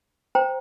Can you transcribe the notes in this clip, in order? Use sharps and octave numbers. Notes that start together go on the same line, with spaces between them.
C5 G5 A#5